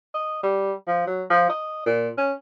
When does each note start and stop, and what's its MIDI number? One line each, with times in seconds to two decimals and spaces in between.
0.14 0.40 75
0.43 0.73 55
0.87 1.04 53
1.07 1.23 54
1.30 1.46 53
1.50 1.85 75
1.86 2.09 46
2.18 2.33 61